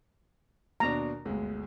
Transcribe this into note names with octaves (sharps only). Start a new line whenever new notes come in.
D#2 B2 D4 A#5
G1 D2 G#3